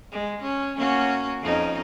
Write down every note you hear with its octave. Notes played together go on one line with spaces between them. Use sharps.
G#3
C#4
A#3 C#4 F#4
F2 C#4 D#4